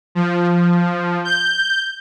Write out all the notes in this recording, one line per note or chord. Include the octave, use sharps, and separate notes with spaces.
F3
G6